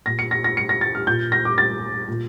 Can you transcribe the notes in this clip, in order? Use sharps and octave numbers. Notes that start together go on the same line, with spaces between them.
A#2 A#6
C#7
A#6
A#6
C#7
A#6
A6
F6
A#2 G6
A#6
D6
A6
A#2